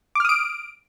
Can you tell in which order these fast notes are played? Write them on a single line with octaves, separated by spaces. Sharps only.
D6 F6 D#6 D7